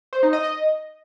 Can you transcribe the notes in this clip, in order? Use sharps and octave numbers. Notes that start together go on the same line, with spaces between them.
C5
D#4
D#5
D#5